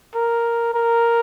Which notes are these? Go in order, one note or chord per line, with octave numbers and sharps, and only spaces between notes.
A#4
A#4